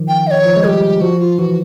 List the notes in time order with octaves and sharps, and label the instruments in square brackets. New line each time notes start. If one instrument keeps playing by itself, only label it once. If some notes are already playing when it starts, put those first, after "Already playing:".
Already playing: [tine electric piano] D#3 F3
[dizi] G5
D#5
C#5
[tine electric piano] F3
G#3
[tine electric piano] G3 [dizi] G#4
[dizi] G4
[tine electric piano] F3 [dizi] F#4
[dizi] F4
[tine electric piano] E3 [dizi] F#4